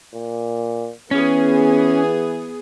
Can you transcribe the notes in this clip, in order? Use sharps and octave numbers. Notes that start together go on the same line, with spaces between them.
A#2
E3 B3 C#4 G#4